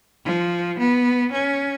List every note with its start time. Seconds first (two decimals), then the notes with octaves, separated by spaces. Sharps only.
0.25 F3
0.79 B3
1.32 C#4